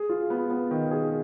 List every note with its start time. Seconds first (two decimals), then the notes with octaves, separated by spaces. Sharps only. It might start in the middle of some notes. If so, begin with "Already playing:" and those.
Already playing: G#4
0.10 F4
0.30 B3
0.50 B3
0.71 D#3
0.91 G#4